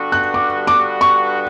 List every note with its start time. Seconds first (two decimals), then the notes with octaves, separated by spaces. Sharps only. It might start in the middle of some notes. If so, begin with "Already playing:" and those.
Already playing: G2 D3 G3 B3 F#4
0.12 F#6
0.34 D6
0.67 D6
1.01 C#6